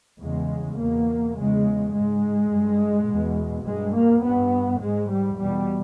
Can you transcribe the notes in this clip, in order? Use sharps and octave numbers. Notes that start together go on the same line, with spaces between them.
E2 C#3 G#3
E2 B2 A#3
E2 C#3 G#3
G#2 G#3
G2
E2 B2
G2 G#3
A#3
G2 B3
G#2 G#3
G3
E2 B2 G3